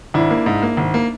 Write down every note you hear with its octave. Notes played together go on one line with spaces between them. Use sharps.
G#1 D4 E4
A#3
G#2
A#3
G#1
A#3